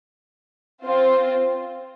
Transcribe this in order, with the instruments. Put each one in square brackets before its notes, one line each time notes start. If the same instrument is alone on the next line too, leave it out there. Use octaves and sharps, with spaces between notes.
[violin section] C4 F4 C5